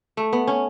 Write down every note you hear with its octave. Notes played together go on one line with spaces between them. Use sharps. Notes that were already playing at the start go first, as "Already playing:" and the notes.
A3
B3
C#4